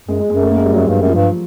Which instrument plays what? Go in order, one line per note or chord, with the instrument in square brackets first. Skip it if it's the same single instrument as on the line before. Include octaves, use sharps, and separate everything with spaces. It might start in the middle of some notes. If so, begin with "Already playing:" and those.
[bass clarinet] F#2 [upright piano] G#3
[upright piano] G#3
[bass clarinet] F#2 [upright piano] G#3
[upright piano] A3
A#3
G#3
G3
[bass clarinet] F#2 [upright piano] F#3
[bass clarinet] G2
F#2
[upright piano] F3
[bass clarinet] G2